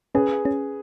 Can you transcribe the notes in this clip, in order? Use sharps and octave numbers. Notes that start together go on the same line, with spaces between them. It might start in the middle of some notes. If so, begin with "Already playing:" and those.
C#4 G#4 B4
C#4